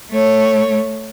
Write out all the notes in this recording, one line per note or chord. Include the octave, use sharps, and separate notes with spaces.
A3 C#5